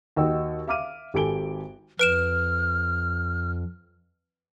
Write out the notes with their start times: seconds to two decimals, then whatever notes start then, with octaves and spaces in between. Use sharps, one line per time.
0.16 D#2 D#4 F#4 D#5 G5 E6
0.67 E5 F5 D6 F6 D#7
1.14 G#1 G4 A4 G#5 D7 G7
1.99 F2 B4 F6 D7 E7